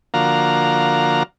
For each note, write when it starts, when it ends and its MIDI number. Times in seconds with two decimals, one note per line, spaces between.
0.14 1.23 50
0.14 1.23 53
0.14 1.23 58
0.14 1.23 66
0.14 1.23 77
0.14 1.23 82